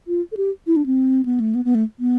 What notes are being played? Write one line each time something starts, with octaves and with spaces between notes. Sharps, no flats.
F4
A4
G4
E4
D4
C4
B3
A3
B3
B3
A3
B3